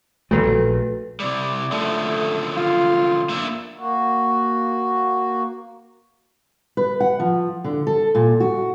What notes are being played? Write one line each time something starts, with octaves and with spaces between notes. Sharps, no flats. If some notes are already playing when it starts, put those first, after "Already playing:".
A2 F#3 G#3 F#4 A4 B4
A#1 E3 A3
C3 G3 D5
F#2 D3 F3 A3
F4
A#3 D4 E5
A#3 F#4
B4
F#5
F3
D3
A4
A#2
F#4